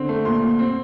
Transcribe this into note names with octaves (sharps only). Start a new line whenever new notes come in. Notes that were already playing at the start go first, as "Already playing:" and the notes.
Already playing: D3 C4 C6
A3
A#2 C6
A#2
C4